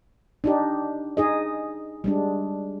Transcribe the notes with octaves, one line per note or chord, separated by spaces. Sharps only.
D4 D#4 G4
D#4 G#4 D#5
G3 G#3 D4